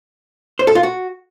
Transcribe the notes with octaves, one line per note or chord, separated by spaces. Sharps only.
C5
A4
F4
F#4